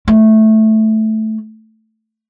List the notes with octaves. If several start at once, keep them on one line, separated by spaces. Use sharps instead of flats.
A3